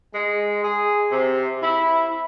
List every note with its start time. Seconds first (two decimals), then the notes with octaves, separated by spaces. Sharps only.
0.14 G#3
0.63 G#4
1.10 C3
1.62 E4